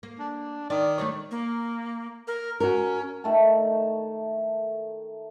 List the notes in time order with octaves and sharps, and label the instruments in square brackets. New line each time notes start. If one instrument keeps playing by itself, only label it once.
[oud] A#3
[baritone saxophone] D4
[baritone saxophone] D#3 [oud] D5
[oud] A3 D4 C#5
[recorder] A#3
A#4
[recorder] C#4 [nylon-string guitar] F#4 A#4
[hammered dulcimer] D#3 A3 A5